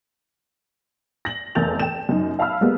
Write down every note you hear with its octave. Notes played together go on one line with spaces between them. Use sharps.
A#6 F#7
F1 E2 A#4 G6 A6 F7
G5 E7
F#2 D#4
E5 F5 A5 B5 E6 F6
G3 G#3 A#3 B3